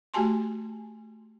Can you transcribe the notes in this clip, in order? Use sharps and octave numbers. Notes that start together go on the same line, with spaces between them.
A3 F#4 G4 G#5 A5 C6